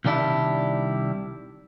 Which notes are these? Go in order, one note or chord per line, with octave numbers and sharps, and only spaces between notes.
C2 D#3 G3 D4 E4